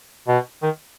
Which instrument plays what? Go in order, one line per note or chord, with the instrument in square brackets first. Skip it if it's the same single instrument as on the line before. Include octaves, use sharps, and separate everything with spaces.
[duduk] B2
D#3